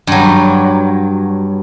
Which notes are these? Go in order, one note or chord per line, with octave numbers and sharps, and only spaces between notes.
G2 F#3